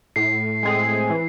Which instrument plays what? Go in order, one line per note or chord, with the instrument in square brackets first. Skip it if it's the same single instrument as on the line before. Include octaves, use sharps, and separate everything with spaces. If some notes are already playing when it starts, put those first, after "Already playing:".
[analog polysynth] A2 [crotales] C7
[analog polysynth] G#3 C4 G#4
E3